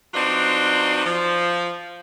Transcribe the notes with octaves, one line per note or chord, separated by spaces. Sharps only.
F#3 C4 D4 D#4 F4 B4
F3